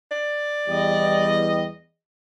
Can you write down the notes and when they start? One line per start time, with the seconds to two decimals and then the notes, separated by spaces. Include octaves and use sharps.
0.11 D5
0.68 E2 G3 D#5